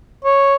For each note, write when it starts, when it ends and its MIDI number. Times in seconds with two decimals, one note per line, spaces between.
0.25 0.55 73